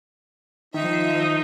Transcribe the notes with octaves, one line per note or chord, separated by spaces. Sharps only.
D#3 F3 D#4 E5